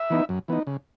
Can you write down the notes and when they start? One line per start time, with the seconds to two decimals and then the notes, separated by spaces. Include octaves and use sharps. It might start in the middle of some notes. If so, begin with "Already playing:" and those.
Already playing: E5
0.10 E3 B3 D#4
0.29 F#2
0.48 E3 B3 D#4
0.67 C#3